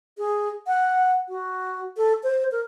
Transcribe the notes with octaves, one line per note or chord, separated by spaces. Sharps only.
G#4
F#5
F#4
A4
C5
A#4